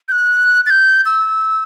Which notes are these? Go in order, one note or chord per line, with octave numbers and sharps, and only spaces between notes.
G6
F#6
A6
G6
E6